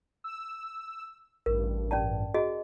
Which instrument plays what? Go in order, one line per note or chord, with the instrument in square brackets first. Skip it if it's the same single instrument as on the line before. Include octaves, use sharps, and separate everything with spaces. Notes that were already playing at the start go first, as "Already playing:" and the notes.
[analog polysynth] E6
[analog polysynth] A1 G2 [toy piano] A#4
[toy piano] C#4 D5 A5
F#4 G#4 D#5